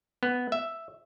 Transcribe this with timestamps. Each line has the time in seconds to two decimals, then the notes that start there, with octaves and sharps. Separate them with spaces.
0.23 B3
0.52 E5